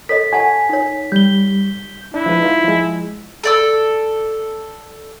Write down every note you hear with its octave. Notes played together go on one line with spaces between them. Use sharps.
A4 C#5 D#5 B6
G4 F#5 G#5 A5
D#4 C#5
G3 G6 G7
D4 E4
F3 G#3 B4
D#4 F4
F3 G#3
A4 D5 E6